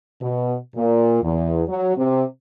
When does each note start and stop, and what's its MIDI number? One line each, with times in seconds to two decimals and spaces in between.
0.21 0.56 47
0.76 1.23 46
1.23 1.63 40
1.68 1.94 54
1.97 2.23 48